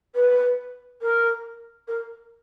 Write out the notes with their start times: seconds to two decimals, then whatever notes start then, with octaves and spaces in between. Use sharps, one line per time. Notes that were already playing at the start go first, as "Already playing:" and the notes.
0.15 B4
1.02 A#4
1.88 A#4